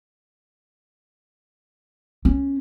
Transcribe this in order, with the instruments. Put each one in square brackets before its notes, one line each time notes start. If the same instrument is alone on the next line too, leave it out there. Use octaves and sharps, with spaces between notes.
[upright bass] C#4